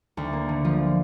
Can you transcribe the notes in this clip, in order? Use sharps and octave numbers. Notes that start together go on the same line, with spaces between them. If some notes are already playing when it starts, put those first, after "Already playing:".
D2
A#3
D3
F3